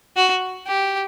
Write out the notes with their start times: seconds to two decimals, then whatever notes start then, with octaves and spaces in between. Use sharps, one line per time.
0.16 F#4
0.67 G4